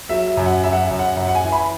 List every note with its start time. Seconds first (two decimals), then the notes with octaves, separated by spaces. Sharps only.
0.09 F#3 E5
0.28 E5
0.37 F#2
0.46 F#5
0.64 F#2 E5
0.73 F#5
0.82 E5
0.91 F#2
0.99 F#5
1.17 F#2 F#5
1.29 F#5
1.35 G#5
1.44 E3
1.52 B5